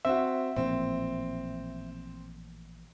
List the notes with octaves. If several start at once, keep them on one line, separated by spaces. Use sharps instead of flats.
C4 F#4 E5
A1 A#2 F3 C4